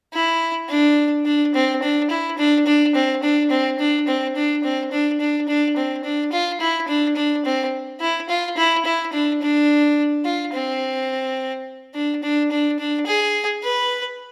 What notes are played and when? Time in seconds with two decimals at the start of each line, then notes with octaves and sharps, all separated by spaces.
0.14 E4
0.70 D4
1.26 D4
1.55 C4
1.82 D4
2.10 E4
2.38 D4
2.66 D4
2.95 C4
3.23 D4
3.51 C4
3.79 D4
4.08 C4
4.36 D4
4.64 C4
4.92 D4
5.20 D4
5.48 D4
5.76 C4
6.04 D4
6.32 F4
6.61 E4
6.88 D4
7.16 D4
7.45 C4
8.01 E4
8.29 F4
8.57 E4
8.85 E4
9.13 D4
9.42 D4
10.25 F4
10.54 C4
11.95 D4
12.23 D4
12.51 D4
12.79 D4
13.06 G#4
13.64 B4